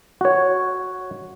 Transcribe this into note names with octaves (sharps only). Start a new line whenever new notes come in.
F#4 C#5